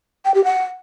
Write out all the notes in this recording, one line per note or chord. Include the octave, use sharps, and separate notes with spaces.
G5
G4
F#5